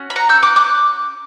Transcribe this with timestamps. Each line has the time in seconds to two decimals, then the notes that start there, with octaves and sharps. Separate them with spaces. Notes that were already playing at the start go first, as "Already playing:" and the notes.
Already playing: C#4 F#4
0.10 B5
0.16 F#5 A#5
0.29 E6 G6
0.43 D6 F#6
0.56 D6 F#6